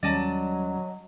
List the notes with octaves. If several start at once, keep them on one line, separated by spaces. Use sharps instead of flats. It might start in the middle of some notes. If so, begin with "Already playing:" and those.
D#2 F#3 G3 C#4 D5 D#5 A5